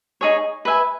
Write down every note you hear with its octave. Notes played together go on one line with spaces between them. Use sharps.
D#4 G#4 C#5
B4 E5 G#5